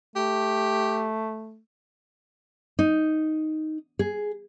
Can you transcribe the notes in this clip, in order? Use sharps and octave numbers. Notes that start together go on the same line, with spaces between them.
A3 G4
D#4
G#4